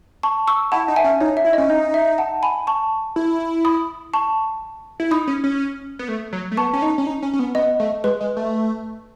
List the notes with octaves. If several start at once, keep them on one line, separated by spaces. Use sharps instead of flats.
A5 C#6
C#6 E6
E4 F#5 A5
D#4
E5 G#5
C#4
D#4 C#5
E5
E4
C#4 D#5
D#4 D#5
E5
F#5 A5
G#5 B5
A5 C#6
E4
B5 D#6
A5 C#6
E4
D#4 B5 D#6
C#4
C#4
B3
A3
F#3
A3
B3 A5 C#6
C#4
D#4
C#4
D#4
C#4
C#4
B3
B3 D#5
A3
G#3 B4
G#3
A3